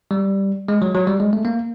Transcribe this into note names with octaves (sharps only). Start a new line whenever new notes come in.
G3
G#3
F#3
F#3
G3
G#3
A3
A#3